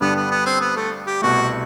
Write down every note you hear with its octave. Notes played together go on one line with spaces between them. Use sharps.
G2 D3 G3 B3 D4
B3
B3
C4
B3
A3
G4
C2 B2 A3 F#4